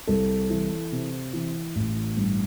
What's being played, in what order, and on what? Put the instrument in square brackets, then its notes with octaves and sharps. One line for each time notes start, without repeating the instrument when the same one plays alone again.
[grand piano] C2 A4
E3
C3
E3
A1
G2